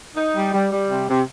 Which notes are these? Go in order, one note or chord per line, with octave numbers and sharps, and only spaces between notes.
D#4
G3
G3
G3
C3
C3